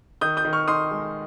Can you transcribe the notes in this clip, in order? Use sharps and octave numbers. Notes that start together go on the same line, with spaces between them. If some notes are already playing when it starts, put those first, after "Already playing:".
D#3 D#6 G6
D#6 G6
D#3
C#6 F6
D#4 C6 D#6
G#3